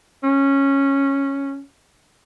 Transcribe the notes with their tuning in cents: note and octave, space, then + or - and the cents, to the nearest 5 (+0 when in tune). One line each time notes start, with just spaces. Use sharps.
C#4 -10